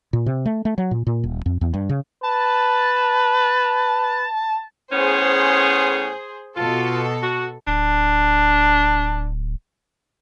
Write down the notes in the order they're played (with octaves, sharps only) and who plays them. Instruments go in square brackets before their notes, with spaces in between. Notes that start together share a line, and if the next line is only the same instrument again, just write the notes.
[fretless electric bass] A#2
C3
A3
A3
F#3
A#2
A#2
D#1
F2
E2
G2
C#3
[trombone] B4 [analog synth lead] A5
[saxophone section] A2 B3 C#4 [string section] G#4 C5
[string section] B2 A4 [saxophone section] F4
[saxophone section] F#4
[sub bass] D1 [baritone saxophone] D4